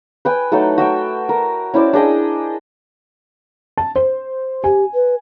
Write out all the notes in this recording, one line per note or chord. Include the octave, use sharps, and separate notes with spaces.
B4 G5 G#5
F#3 A3 D#4 A4
F#4 E5 G5
A#4
C#4 E4 C5 D5
D4 G#4 D#5 G5
A5
C5
G4 G#5
B4